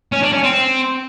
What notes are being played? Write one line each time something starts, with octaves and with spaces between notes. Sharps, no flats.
C#4
D4
C#4
C4